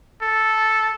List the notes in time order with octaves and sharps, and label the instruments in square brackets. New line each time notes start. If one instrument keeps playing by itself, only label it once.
[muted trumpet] A4